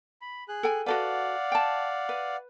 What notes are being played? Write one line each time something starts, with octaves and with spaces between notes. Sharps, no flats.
B5
G#4 F#6
A4 G5 G#5
F#4 A4 B4 D5 F5 F#5
G5 A5
B4